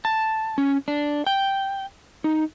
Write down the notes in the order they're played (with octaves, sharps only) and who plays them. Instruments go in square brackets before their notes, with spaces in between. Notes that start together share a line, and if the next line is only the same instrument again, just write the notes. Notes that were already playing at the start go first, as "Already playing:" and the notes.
[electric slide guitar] A5
C#4
D4
G5
D#4